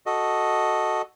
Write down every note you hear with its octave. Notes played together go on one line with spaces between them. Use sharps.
F#4 A4 D#5